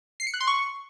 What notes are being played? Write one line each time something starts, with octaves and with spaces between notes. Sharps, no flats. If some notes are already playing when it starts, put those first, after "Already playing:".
C7
C#7
F#6
C6
C#6